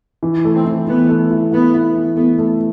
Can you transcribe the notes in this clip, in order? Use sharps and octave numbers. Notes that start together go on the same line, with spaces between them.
E3
A3
C4
E3
E3 B3
A3
E4
B3 E4
E4
E3
A3 B3
A3